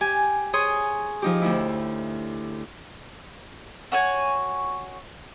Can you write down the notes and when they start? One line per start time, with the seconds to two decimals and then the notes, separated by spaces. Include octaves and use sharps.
0.01 G4 G#5
0.53 G#4 C#5 C6 D#6
1.22 F3 D#4 G4
1.42 D2 E4
3.92 F#4 C#5 G#5